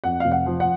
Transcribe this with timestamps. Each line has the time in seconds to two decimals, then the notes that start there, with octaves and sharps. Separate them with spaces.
0.04 F2 F#5
0.20 F1 F5
0.32 F#5
0.46 F3
0.60 F#5